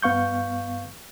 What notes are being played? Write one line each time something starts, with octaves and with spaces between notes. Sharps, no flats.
G2 B3 F5 C#6 G6